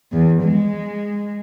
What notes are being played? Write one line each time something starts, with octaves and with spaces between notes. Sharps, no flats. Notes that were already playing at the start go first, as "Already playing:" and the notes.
E2
G#3